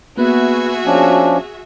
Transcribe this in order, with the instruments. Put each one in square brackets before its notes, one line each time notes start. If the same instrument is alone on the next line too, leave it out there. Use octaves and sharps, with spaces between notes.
[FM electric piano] A#3 B3 [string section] F#4 G#4 E5 [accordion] B4
[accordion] F3 C#4 D4